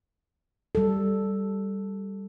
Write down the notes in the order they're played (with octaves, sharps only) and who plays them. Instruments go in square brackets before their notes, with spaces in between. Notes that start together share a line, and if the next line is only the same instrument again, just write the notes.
[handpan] G3 A4